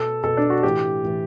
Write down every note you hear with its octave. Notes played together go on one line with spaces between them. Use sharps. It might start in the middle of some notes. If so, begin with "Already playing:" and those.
Already playing: B2 A4
B2 A4
D4
F#4
A2 E3 G4
A2 E3